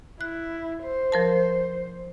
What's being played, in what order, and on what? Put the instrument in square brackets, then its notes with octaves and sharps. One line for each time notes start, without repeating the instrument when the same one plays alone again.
[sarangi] E4 [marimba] F#6
[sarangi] C5
[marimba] F3 A#4 A5